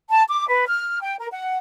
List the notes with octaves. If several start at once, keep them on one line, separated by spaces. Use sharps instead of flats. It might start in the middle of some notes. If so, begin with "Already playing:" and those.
A5
D6
B4
F6
G5
A#4
F#5